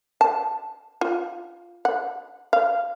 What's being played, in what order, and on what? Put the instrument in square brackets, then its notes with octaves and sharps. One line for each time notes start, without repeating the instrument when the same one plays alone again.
[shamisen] A5
F4
F#5
F5